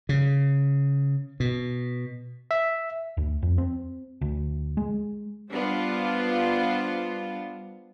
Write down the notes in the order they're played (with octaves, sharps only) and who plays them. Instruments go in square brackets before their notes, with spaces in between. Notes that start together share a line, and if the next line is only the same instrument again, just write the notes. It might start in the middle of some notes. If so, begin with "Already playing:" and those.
[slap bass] C#3
B2
[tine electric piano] E5
[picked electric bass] D2
F2
C4
D2
G#3
[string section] G3 B3 D4 F4 C5